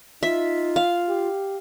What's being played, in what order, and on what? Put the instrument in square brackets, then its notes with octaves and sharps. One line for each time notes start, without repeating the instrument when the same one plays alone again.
[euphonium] D#4 [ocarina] F4 [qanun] E5
[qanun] F5
[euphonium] G4